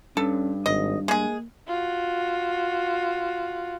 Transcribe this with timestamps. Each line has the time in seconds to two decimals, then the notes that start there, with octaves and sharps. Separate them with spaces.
0.17 G2 C#4 A4
0.66 G#1 D#5
1.08 G#3 A#3 G#4
1.68 F4 F#4